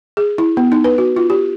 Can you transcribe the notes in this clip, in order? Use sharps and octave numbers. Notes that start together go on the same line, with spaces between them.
G#4
E4
B3
D#4
B4
F#4
F4
G4